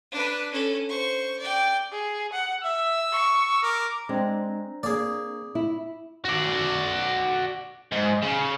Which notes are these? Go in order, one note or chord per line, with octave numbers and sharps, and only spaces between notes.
D4 B4
C#4 A4
C5 C#6
D5 G5
G#4
F#5
E5 E6
C#6
A#4 D6
G#3 C4 D4 A#5
A#3 G#4 D5
E4
F#4 D5
G#2
C#3